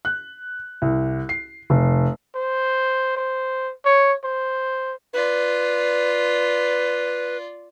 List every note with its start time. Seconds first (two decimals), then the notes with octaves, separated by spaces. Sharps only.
0.05 F#6
0.82 C2
1.29 C7
1.70 F1
2.35 C5
3.17 C5
3.85 C#5
4.24 C5
5.13 F4 B4 D5